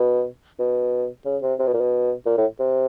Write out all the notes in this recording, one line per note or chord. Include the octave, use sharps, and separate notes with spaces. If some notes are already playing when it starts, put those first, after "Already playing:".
Already playing: B2
B2
C#3
C3
C3
B2
A#2
B2
A#2
A2
C3